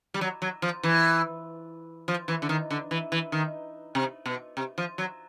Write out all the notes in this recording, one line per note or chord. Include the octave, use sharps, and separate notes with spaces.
G3
F#3
F#3
F3
E3
F3
E3
D3
D#3
D3
E3
E3
D#3
C3
B2
C3
F3
F#3